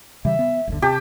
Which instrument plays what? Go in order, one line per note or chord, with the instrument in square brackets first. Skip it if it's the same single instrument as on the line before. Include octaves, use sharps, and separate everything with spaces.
[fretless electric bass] C#3 E3 G3 [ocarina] E5
[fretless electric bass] B3
G1 D#2 D3
[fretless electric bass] C3 [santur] G4 [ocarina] A5